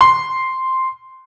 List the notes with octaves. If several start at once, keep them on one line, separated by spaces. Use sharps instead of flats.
C6